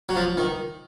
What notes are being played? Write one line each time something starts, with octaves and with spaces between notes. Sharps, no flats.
F#3
F3
D#3